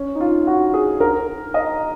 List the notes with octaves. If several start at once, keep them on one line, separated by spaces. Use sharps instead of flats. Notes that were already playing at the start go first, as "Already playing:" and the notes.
Already playing: C#4
D#4
F4
F#4
G#4
A#4
D#5